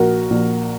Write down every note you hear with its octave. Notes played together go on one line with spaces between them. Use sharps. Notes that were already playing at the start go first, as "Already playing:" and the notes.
Already playing: A#1 F#4 A#4
A#1